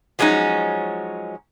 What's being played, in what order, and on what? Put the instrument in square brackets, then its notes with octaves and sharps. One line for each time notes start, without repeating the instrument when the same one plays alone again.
[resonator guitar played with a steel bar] F3 F#3 G#3 C#4 D#4